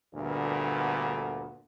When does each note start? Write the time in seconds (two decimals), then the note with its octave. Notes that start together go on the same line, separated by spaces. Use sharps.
0.15 D2 G2 A#2 D3 B3